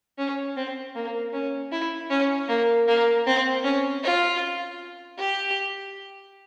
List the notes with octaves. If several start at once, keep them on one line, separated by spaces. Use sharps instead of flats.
C#4
C4
A#3
C#4
E4
C#4
A#3
A#3
C4
C#4
F4
G4